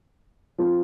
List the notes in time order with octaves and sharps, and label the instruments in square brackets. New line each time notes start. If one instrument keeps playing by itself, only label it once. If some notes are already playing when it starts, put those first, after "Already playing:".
[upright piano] F3 C4 F4